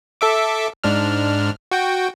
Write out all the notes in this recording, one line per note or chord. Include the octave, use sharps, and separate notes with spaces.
A4 E5 D6
G#2 D4 F6
F#4 G5